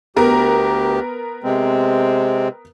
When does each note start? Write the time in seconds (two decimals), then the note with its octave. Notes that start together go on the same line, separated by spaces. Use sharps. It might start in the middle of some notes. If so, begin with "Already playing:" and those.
0.16 D2 B3 G4 A#4 A#5
1.44 C3 G#3 C4